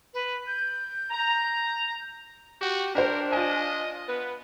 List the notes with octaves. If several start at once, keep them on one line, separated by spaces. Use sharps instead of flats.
B4
G6
A#5
F#4 G4
D4 G4 A#4 C5
F4 D#5 G#5
B3 B4